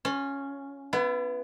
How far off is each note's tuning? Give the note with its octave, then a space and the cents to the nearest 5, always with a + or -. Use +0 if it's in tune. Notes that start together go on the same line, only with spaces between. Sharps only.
C#4 +0 F4 +35
B3 +0 E4 +40